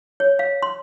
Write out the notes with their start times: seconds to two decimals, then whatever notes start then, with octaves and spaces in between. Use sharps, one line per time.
0.20 C#5
0.39 F5
0.62 C6